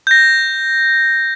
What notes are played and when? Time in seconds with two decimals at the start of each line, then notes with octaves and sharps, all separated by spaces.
0.07 G6 A#6